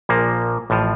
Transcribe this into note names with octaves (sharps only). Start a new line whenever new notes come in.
A#1 A#2 F3 A#3
A1 A2 F3